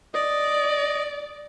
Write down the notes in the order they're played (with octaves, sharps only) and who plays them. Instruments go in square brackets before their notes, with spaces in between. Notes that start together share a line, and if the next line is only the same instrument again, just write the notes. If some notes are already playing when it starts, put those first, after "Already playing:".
[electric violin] D5 [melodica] D#5